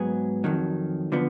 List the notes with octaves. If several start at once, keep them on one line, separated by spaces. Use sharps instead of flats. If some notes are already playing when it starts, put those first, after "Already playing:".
Already playing: G#2 F#3 B3 G#4
F2 D#3 F#3
D3 F3 B3